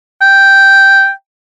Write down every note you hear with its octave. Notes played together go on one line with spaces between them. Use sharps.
G5